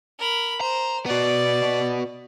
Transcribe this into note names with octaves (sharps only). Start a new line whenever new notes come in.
A#4 B5
C5 A#5
B3 F#4 D5